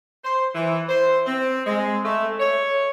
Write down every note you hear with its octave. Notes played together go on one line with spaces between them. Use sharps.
C5
E3
C5
C4
G#3
A3
C#5